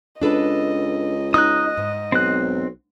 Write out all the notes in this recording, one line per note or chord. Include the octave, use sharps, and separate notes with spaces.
C#2 D4 A4 B4 D#5
D#4 D#5 D#6 F#6
G#2
B1 C4 F#6